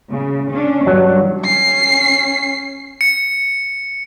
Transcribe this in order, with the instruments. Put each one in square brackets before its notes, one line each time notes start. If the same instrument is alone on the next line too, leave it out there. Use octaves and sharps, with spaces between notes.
[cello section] C#3
C#4 D4
[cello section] G2 [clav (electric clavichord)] F#3 D4
[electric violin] C#4 C7
[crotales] C#7